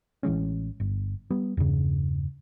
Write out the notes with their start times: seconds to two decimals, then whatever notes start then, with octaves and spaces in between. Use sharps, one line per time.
0.23 A1 E3 G#3 C#4
0.80 G1
1.30 G3 B3
1.57 E2 G2 C#3